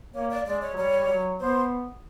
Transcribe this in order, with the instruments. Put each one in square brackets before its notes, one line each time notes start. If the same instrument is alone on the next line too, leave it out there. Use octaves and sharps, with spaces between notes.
[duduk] A#3 [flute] C#5
[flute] D5
[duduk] G#3 [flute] D5
[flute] C#5
[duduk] F#3
[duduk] G3 [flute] C#5
[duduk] G3
F#3
[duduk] B3 [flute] C5